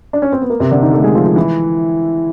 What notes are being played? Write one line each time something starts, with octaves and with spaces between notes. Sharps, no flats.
D4
C#4
C4
B3
A#3
C3 C4
D3 D4
D#3 D#4
A3 A4
G#3 G#4
F3 F4
F3 F4
E3 E4